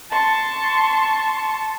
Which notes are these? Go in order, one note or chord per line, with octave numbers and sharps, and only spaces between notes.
A5 C6 C#6